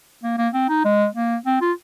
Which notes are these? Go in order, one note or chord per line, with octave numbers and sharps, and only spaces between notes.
A#3
A#3
C4
D#4
G#3
A#3
C4
F4